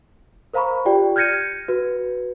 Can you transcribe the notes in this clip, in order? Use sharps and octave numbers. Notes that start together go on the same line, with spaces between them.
A#4 C5 F5 A#5 B5 C#6
F4 G4 D5 G5
F6 G6 G#6 A#6 C#7 D#7
F#4 B4